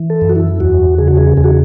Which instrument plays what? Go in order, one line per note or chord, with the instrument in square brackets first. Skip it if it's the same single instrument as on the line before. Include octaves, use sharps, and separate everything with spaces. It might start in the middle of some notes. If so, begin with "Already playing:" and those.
Already playing: [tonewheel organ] E3
A4
F#2
F#4
E4
E2 F#4
C#3 G#4
F#4
G#4
E2 G#4
F#4